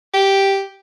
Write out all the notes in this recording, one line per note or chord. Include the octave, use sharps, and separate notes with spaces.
G4